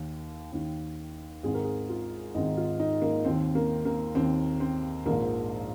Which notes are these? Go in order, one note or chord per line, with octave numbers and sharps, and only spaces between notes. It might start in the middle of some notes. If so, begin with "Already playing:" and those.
Already playing: D#2 D#3
D#2 D#3
G#1 G#2 D#3 G#4
A#4
G#4
F4
G#1 G#2 D#3 D#4
F4
D#4
A#3
D#2 D#3 C4
A#3
A#3
D#2 D#3 C4
C4
A#1 G#2 F3 A#3